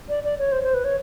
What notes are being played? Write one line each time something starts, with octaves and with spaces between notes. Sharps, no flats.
D5
D5
C#5
C5
C5
B4
C#5